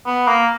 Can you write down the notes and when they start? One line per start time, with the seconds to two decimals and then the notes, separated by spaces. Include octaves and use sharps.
0.06 B3
0.28 A#3